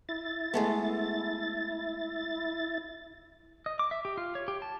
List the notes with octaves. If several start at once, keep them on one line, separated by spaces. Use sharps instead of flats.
E4 A6
G#3 A3 B3
D#5
D6
E5
G4
F4
C#5
G4
A5